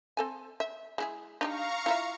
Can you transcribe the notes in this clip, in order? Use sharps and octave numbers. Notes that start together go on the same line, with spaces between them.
C4 A4 G#5
E5
G#3 E4 G#4
D4 D#4 G4 F5 A#5 C#6
E4 F4 E5